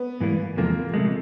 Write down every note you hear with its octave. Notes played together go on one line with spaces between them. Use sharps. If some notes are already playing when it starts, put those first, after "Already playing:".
Already playing: B3
G#2 E3 G3 A#3
E2 C3 F3 G#3 A#3
C3 F3 G#3 A3